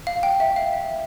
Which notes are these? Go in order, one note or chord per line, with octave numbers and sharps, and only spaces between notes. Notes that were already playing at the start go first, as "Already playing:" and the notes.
F5
G5
E5
F5
E5